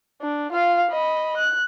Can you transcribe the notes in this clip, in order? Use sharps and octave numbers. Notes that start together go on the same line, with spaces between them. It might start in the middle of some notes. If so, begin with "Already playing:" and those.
D4
F4 F5
D#5 B5
F#6